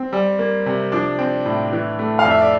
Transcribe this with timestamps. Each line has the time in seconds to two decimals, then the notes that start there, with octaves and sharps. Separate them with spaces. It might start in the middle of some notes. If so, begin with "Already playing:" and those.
Already playing: C4
0.13 G3
0.39 A#3
0.66 C3
0.92 F3 D4 D5
1.19 C4
1.46 A2
1.72 E3
1.99 A3
2.19 F5
2.25 F2
2.30 E5
2.41 D5